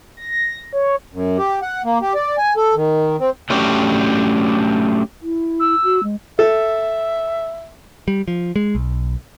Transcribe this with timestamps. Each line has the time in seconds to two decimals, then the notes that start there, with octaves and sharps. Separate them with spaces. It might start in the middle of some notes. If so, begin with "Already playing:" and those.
0.17 A#6
0.73 C#5
1.13 F#2
1.38 G4
1.62 F#5
1.85 A#3
2.02 G4
2.15 D5
2.38 G#5
2.57 A4
2.76 D#3
3.20 C4
3.50 F#3 A3 C#4 D4 G4
5.21 E4
5.59 E6
5.84 F#4
6.03 G#3
6.39 A4 E5
8.08 G3
8.28 F3
8.56 G#3
8.75 B1